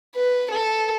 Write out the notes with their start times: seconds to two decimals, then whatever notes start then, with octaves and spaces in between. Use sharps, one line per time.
0.16 B4
0.51 A4